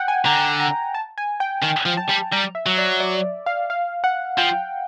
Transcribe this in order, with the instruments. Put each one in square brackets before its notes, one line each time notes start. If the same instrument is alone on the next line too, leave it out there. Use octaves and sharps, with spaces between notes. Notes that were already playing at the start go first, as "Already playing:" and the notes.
Already playing: [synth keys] F#5 G5
G#5
[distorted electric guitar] D3 [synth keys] A#5
[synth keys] A#5
A5
G#5
G5
[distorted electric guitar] D#3 [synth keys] G5
[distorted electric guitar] F3
[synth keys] A5
[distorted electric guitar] G3
[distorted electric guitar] G3 [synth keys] A#5
[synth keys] E5
[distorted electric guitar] F#3
[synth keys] D5
D5
F5
F5
F#5
[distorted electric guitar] F3 [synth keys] G5